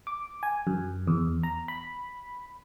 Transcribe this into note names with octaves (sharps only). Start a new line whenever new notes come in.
D6
G#5
F#2
E2
A#5
B5